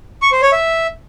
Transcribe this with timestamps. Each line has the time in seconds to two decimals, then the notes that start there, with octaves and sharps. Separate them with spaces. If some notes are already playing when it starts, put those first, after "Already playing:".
0.22 C#6
0.32 C5
0.42 C#5
0.52 E5